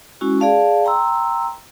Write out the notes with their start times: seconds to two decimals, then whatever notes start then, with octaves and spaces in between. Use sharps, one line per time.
0.21 G#3 C#4 E4 F#4
0.40 G#4 D5 F5 A5
0.85 G5 A#5 C6 E6